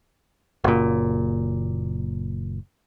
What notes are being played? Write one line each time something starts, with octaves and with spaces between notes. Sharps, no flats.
F#1 A#2